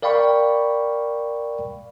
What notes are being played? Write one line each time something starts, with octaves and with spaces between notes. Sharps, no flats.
A#4 D5 F5 G5 B5 C#6